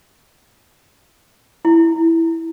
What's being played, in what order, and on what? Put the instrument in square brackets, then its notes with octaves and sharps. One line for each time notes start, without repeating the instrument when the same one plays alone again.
[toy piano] E4